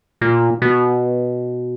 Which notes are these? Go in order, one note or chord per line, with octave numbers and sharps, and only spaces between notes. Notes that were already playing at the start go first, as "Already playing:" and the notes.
A#2
B2